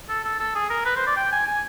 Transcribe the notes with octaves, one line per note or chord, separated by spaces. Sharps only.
A4
A4
A4
G#4
A#4
B4
C5
D5
G5
G#5
G#5